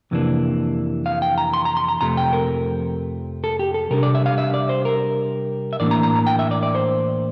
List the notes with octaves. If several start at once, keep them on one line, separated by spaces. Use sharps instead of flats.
F2 C3 E3 A#3 D4
F5
G5
A#5
C6
A#5
C6
A#5
F2 C3 F3 A3 A#5
G5
A#4
A4
G4
A4
C3 G3 D4 A#4
D5
E5
F5
E5
D5
C5
A#4
E5
A2 E3 A#3 D4 D5
A#5
A#5
A#5
G5
E5
D5
D5
C5